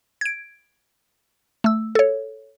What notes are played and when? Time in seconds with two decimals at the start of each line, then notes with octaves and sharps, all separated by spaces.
0.21 G#6 D7
1.64 A3 E6
1.95 A4 C#5